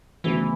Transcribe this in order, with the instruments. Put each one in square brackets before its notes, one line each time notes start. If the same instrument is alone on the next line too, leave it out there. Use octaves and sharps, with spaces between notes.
[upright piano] D2 C#3 F#3 B3 [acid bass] E3